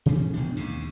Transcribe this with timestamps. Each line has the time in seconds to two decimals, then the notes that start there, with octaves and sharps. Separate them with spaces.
0.06 C3 E3 G3 A3
0.33 G#1 B2 F3 D4
0.56 D#2 G#2 C3